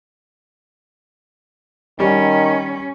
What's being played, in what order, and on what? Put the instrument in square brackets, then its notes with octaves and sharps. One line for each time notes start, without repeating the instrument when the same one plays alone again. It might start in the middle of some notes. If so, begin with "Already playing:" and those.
[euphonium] D#3 [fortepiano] G3 [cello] C#4